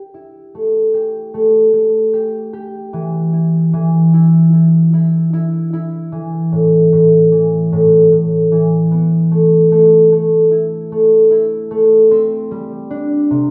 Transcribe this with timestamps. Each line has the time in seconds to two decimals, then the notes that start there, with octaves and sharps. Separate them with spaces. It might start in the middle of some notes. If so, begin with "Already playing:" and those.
Already playing: G4
0.14 E4
0.55 A3
0.94 G4
1.34 A3
1.73 A3
2.13 G4
2.53 G4
2.93 E3
3.33 E4
3.73 E3
4.14 E4
4.53 E4
4.94 E4
5.33 E4
5.73 E4
6.12 E3
6.52 A2
6.93 A2
7.32 E3
7.73 A2
8.12 A2
8.52 E3
8.91 B3
9.31 A3
9.72 A3
10.12 A3
10.51 E4
10.92 A3
11.31 E4
11.71 A3
12.11 C4
12.51 G3
12.90 D4
13.31 C3